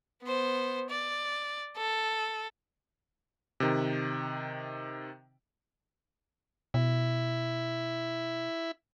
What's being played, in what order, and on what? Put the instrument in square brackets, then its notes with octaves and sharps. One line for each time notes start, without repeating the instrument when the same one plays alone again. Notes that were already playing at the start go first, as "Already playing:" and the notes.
[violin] B3 C5
D5
A4
[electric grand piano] C3 D#3
[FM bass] B2 [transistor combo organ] E4